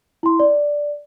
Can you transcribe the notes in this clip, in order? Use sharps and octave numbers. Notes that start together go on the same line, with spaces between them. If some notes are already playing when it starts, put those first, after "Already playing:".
E4 C6
D5